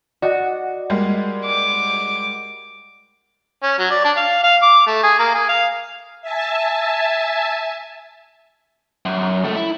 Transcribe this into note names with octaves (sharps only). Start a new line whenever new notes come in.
F#4 D5 D#5 F#5
G3 G#3 A#3
D6
C#4
F#3
D5
D4
F5
F5
D6
A3
G#4
A#3
G#4
F5
E5 G#5 A5
F#2
C#2 A3
E4